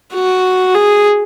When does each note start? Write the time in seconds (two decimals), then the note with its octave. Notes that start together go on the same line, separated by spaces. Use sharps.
0.14 F#4
0.75 G#4